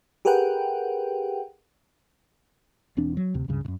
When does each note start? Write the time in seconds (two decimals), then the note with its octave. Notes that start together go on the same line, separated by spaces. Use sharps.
0.25 G4 G#4 A#4 B4 F#5 G5
2.97 E1 E2 C4 D4
3.17 F#3
3.34 D2 C3
3.48 C#2 G2 C#3
3.65 F#2 A2